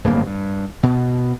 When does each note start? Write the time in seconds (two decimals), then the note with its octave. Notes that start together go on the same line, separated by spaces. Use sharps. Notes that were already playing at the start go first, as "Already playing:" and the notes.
0.04 D1 G1 G2 A#3
0.27 G2
0.83 B2